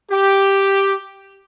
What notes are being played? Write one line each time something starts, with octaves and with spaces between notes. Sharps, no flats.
G4